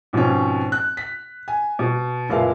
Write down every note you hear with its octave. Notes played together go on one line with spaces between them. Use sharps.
G#2 B2 F3 C4 C#4
F#6
B6
G#5
B2
F#1 A#2 G#3 E4 B4 F5